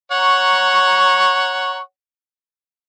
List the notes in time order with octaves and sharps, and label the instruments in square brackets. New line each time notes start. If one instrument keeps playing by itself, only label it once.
[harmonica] C#5 F#5 [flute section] A#5 C#6